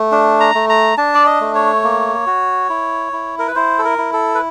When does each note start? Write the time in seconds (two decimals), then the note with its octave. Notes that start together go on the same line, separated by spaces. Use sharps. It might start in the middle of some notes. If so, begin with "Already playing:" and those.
Already playing: A3
0.12 D4
0.40 A#5
0.55 A3
0.69 A#5
0.98 D4 A5
1.14 D5
1.26 D#5
1.41 A3
1.55 C#5
1.84 A#3
2.27 F#4
2.70 E4
3.13 E4
3.39 A#4
3.47 B4
3.55 E4 C5
3.79 A4
3.85 A#4
3.98 E4
4.13 A4
4.35 B4